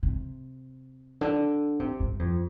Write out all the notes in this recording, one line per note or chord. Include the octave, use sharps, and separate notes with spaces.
C3
D3
C3
G2
F2